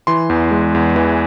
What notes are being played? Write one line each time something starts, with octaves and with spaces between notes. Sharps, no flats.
E3 C6
E2
G#3
E2
E3